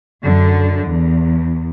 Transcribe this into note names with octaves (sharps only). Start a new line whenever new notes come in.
F#2 D3
E2